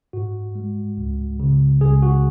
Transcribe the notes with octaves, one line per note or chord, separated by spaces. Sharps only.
G#2 F#4
G#3
C#2
C#3
C#2 G#4
F#4